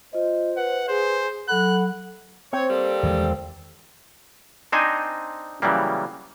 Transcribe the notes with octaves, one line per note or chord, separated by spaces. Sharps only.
F4 C5 D#5
B4 F#5
G#4 C5
F#3 A4 F#5 B5 F#6
C4 C#5
G3 A#3 A4
E2 D#3 G#3
C4 D4 D#4 C5 D#5 G#5
C#3 E3 F#3 G3 A#3